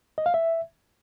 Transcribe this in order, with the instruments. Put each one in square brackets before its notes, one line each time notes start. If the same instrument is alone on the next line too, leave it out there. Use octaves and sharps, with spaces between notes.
[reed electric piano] D#5
F5
E5